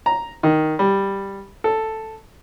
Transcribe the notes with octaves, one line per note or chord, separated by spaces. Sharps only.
A#5
D#3
G3
A4